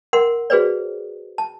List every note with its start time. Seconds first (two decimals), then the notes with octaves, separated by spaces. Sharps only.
0.13 A#4 F#5 C6
0.50 F#4 G#4 B4 C5 D5
1.38 A5